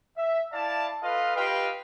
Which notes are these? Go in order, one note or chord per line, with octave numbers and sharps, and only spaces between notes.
E5
E4 D5 F5 A5
F4 A4 B4 D#5 F5
F4 G4 B4 D#5 F5 G5